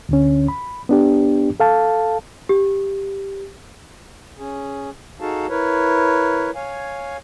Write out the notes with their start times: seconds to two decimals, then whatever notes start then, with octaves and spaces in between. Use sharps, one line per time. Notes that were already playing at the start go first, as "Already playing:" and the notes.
0.09 D2 D3 C#4
0.48 B5
0.89 B3 D4 G4
1.60 A4 F5 A5
2.49 G4
4.38 C#4 G#4
5.20 D#4 F#4 G#4 A4 F5 A5
5.49 E4 A#4 B4 C#5
6.55 C#5 F5 G#5